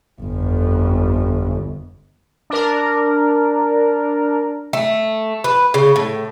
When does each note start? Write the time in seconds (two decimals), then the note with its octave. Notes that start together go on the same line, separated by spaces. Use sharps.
0.21 G1 F2
2.50 D4 A#4
4.73 A3
5.44 B4
5.74 C#3
5.96 A2